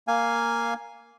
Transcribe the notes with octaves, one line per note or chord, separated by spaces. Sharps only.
A#3 F5 G#5